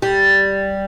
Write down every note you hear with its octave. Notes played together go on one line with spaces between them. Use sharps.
G3